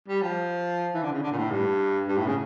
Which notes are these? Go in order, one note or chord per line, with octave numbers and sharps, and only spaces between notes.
G3
F3
E3
D3
C#3
D3
A#2
A2
G2
G2
A2
C#3